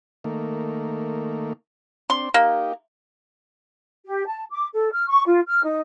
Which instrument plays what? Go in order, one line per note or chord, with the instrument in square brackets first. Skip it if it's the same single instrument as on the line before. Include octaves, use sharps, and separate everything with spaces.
[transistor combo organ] D#3 A3 A#3
[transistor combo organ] C4 D4 [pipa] C6
[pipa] A#3 [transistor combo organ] D#4 G4
[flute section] G4
A5
D6
A4
F6
C#6
F4
F6
D#4